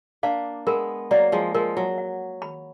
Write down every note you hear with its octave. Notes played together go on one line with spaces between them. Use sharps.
A#3 D4 F5
G#3 B3 A#4
F#3 A#3 D5
F3 G#3
F3 G#3 A#4
F#3
F#5
B5